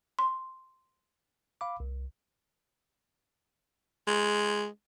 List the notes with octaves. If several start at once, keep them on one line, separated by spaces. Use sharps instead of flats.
C6
F5 B5 D6
C2
G#3